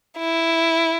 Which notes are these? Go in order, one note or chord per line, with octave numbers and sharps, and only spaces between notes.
E4